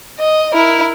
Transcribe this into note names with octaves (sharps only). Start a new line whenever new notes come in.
D#5
E4 A#4